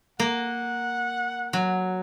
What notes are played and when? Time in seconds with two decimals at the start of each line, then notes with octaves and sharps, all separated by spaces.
0.19 A#3 F#5
1.53 F#3